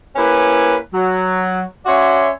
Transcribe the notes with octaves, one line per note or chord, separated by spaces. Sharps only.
A#3 C#4 E4 G4 B4
F#3
C#4 F#4 C#5 D5 E5 C6